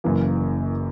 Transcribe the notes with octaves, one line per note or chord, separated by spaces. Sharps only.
F#1 F#2 E3 A#3